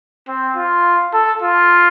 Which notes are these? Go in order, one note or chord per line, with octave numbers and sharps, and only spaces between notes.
C4
F4
A4
F4